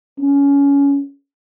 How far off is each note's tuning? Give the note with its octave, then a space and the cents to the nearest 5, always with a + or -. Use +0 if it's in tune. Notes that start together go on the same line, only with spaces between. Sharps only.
C#4 +20